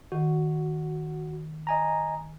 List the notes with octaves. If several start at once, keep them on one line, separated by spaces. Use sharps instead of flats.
D#3 F#4
D#5 G#5 A#5